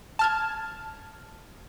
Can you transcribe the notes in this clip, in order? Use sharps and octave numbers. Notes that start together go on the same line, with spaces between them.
A5 F6 G#6